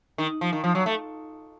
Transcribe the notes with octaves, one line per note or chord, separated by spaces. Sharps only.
D#3
F3
D#3
F3
F#3
A3